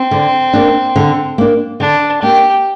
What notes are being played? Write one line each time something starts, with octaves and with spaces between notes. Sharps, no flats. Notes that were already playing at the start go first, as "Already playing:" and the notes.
Already playing: C4
D3
A#3 D4
D3
A#3 D4
D3 D4
A#3 D4 G4